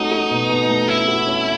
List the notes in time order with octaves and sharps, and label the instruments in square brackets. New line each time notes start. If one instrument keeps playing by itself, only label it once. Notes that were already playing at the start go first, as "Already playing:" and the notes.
Already playing: [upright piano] A3 C#4 F#4 [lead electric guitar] D#4
[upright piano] F#4
B2
B2
A3
[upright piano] C#4 [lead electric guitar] E4
[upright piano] F#4
C#4